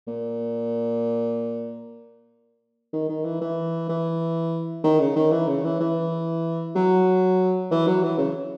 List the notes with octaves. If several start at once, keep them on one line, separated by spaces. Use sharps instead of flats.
A#2
D#3
D#3
E3
E3
E3
D#3
C#3
D#3
E3
C#3
E3
E3
F#3
E3
F#3
E3
C#3